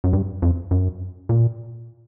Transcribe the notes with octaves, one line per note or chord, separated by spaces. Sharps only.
F#2
G2
F2
F#2
A#2